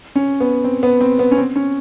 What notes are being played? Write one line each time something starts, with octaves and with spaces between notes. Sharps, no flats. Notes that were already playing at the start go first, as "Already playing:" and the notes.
C#4
B3
C4
B3
C4
B3
C#4
C4
C#4